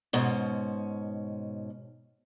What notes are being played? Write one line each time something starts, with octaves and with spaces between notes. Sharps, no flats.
G#2 B2 C#4